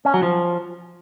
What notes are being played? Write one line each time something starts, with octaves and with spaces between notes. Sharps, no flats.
C#4
F#3
F3